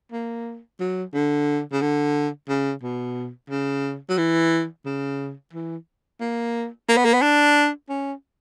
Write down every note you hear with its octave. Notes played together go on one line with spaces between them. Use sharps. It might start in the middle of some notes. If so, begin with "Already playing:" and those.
A#3
F#3
D3
C#3
D3
C#3
B2
C#3
F#3
E3
C#3
E3
A#3
A#3
B3
A#3
B3
D4
C#4